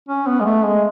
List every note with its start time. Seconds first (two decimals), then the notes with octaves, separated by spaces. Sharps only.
0.09 C#4
0.27 B3
0.41 G#3
0.45 A3
0.64 G#3